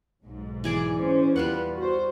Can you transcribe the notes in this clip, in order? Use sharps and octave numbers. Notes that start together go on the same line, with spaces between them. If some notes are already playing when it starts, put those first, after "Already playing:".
B1 G#2
E3 G#4 D5
C#4 C5
E2 G3 F4 B4 F#5
F#4 C5